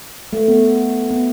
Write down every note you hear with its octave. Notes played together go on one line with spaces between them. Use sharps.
A3
B3
B3